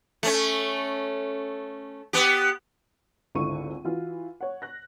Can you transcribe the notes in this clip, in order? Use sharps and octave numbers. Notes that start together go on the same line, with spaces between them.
A3 C#4
B3 G4
G#1 C#2 D3 E4 C#6 D#7
E3 F4 F#4
C#5 F#5
F#6 A#6